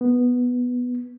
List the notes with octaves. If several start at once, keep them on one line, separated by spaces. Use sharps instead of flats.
B3